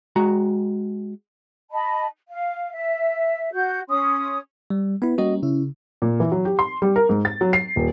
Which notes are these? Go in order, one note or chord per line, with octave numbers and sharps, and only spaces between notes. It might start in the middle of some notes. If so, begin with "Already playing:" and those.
G#3 F#4 A#5
D#5 A5 B5
F5
E5
F#4 G6
C#4 C6 D#6
G3
B3 E4 B4
G3 A#3 C#4 F#4 D#5
C#3 C#4 E4
A#2
E3
F#3
G4
C6
G3
A#4
G#2
A6
F#3
C7
D#1